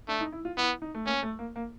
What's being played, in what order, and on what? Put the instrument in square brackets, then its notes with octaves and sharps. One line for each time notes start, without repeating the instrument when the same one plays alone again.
[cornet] A3 [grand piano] D4
[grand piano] D#4
E4
F4
[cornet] B3 [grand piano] E4
[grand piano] D#4
A3
[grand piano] A#3 [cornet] C#4
[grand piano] A3
A#3
A#3